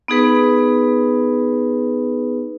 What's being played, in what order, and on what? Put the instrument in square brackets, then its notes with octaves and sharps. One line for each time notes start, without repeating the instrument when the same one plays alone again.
[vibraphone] B3 D#4 G#4 B4